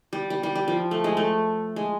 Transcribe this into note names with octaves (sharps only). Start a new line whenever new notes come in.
G3
G3
G3
G3
F3
A3
G#3
A3
G#3